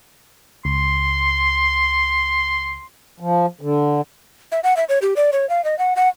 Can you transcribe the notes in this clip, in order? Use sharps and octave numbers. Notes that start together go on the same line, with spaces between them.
C#2 C6
F3
D3
E5
F#5
E5
C#5
G4
D5
C#5
F5
D#5
F#5
F#5